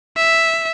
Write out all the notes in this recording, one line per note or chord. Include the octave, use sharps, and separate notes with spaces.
E5